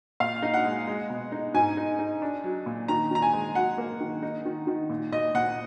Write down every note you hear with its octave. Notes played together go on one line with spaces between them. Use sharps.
A#2 F5
D#4
F#5
G#3
G#3
B2
D#4
G#2 G#5
D#4
D#4
D4
F#3
A#2
D#3 A#5
D#3 A#5
G#5
G#3
F#3 F#5
A#3
D#3
D#4
D#3
D#3
A#2
A#2 D#5
A#2 F#5